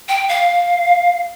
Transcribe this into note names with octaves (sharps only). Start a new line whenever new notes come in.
G5
F5